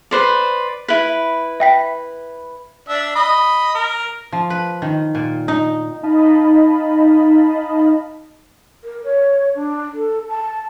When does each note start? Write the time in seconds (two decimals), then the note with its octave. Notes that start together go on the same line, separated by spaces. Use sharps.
0.11 B4 C5 D5
0.88 E4 B4 B6
1.60 E5 G5 B6
2.89 D4 E5
3.16 D#5 B5
3.75 A#4
4.32 F3
4.50 B4
4.82 D#3
5.15 A#2
5.48 D#4
6.03 D#4 D#5 F5 A5 B5
8.84 A#4
9.04 C#5
9.55 D4
9.94 A4
10.29 A5